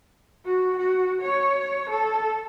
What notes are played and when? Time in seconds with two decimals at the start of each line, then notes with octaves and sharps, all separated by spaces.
0.45 F#4
0.77 F#4
1.21 C#5
1.89 A4